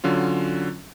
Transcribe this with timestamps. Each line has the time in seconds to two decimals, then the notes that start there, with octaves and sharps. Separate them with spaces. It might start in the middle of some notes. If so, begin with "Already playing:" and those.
0.04 D3 F#3 C#4 F4